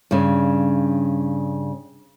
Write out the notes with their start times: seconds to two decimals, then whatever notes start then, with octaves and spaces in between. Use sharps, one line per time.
0.11 G2 C#3